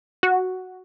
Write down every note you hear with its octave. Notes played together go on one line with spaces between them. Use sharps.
F#4